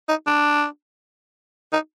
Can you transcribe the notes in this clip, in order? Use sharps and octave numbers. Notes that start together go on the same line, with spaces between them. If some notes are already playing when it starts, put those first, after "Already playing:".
D#4
D4
D#4